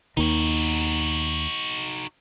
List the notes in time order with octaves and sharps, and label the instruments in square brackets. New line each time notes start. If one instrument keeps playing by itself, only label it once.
[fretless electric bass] D#2 D#3 [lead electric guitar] D#4 F#4